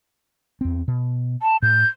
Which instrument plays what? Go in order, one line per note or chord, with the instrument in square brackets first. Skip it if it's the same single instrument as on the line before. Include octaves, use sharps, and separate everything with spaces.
[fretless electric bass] E2 C4
B2
[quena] A5
[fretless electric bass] A2 [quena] G6